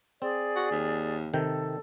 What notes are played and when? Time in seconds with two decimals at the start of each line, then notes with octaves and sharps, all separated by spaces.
0.22 C4 G#4 D5
0.56 F#4
0.71 D#2
1.34 C3 D#3 A4 G5